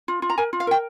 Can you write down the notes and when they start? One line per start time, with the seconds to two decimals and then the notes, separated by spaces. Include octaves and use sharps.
0.08 F4
0.22 F4
0.30 A#5
0.38 A#4 G#5
0.53 F4
0.60 F5
0.67 A#4 G5